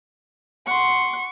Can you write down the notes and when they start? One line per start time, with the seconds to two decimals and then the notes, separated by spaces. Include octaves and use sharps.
0.67 F#5 C6 C#6